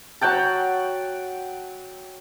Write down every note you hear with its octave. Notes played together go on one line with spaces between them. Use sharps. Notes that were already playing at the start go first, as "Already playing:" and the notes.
F#3 F#5 G5 A5